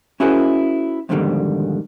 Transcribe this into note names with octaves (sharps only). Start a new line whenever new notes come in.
C#4 E4 F#4 G#4 A#4 C5
F2 G#2 B2 D3 D#3 G3